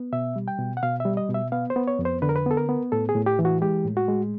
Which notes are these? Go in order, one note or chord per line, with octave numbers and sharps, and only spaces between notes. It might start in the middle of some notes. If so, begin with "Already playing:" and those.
Already playing: B3
B2 E5
G3
G5
B2
F#5
B2 F5
E5
G3
D#5
B2
E5
B3 F5
C5
B3
C#5
F2
C5
D3 B4
A#4
B4
B3 A4
A#4
B3
A2 A4
G#4
A2
G4
E3
F#4
G#3 G4
A2
F#4
G#3